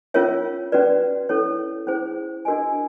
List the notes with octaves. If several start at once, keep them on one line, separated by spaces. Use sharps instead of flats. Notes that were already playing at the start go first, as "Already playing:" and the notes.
C#4 F4 A#4 C#5 E5
C#4 F#4 B4 D5
C#4 E4 A4 C#5
C#4 E4 G#4 C5
D4 F#4 A#4 D#5 G#5